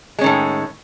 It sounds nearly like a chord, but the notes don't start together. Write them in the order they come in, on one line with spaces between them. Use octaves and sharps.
G#3 C#4 D#3 A2